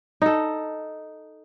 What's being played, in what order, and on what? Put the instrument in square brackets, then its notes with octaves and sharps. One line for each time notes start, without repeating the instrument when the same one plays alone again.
[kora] D#4 A4